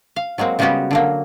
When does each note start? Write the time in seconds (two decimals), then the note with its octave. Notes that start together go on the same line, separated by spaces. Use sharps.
0.16 F5
0.38 F#3 G#3 A#3 C4 F#4
0.59 C#3 G3 G#3 B3 F#4 G4
0.91 D3 F#3 A#3